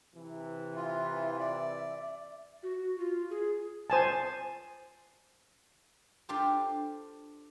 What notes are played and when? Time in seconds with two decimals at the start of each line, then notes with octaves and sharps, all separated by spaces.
0.15 C3 E3
0.76 F4 E5
1.40 D5
2.63 F#4
2.98 F4
3.30 G#4
3.90 C5 G#5 A5
6.29 D4 F4 G4 A4 C5